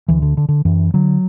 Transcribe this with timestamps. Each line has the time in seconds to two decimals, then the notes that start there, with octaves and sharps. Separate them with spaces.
0.08 D2 E3
0.22 D3
0.37 D3
0.49 D3
0.65 F#2 E3
0.94 D3 F#3